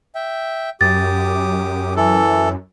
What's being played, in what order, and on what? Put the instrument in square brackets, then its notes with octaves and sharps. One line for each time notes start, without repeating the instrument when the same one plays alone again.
[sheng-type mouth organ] E5 G5
[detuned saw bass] F#2 [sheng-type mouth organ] G4 D6 D#6 [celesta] A6
[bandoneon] E3 A4 [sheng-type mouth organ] E4